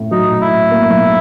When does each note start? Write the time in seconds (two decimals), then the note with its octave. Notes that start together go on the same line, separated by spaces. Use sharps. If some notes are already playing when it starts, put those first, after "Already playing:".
Already playing: A2
0.11 F#3 D#4
0.31 A2
0.41 E4
0.52 A2
0.71 A#3
0.90 B1